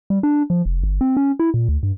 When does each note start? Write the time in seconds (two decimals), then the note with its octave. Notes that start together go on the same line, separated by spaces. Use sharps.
0.10 G3
0.23 D4
0.50 F3
0.66 F1
0.84 G1
1.01 C4
1.17 C#4
1.39 E4
1.54 A#2
1.69 D2
1.83 G2